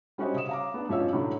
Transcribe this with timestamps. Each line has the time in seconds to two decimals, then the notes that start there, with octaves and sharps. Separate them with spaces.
0.18 G3 C#4 F#4 C5 C#5 D#5
0.34 C#3 C#5 D#6 E7
0.49 F5 A#5 D6
0.74 B3 D4
0.89 F#2 F3 D#4 C#5 F5 E6
1.13 A2 D3 F#3 A3